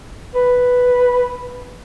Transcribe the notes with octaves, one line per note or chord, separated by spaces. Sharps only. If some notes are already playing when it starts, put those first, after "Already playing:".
B4